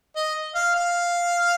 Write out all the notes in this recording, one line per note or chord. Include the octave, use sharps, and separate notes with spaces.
D#5
F5
F5